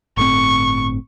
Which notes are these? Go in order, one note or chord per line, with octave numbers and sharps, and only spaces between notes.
G1 A2 C4 C#6